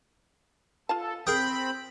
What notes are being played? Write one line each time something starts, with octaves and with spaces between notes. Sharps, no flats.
F4 A4 F5 A5
C4 G#4 A#4 G5 B5 D#6